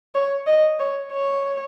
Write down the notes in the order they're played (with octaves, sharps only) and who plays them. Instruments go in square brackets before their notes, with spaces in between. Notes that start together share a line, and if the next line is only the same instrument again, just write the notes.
[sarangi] C#5
D#5
C#5
C#5